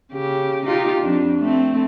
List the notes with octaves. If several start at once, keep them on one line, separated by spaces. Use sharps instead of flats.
C#3 G4
D#4 F4 G4
F2 D4
A3 C4